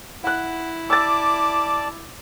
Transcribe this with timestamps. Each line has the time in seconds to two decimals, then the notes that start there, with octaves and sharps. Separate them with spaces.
0.24 E4 F#5 F#6
0.90 D5 A5 D6 E6 A6